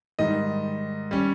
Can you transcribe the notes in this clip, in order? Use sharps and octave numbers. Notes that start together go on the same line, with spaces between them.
G#2 D#3 G3 D#5
G3 C#4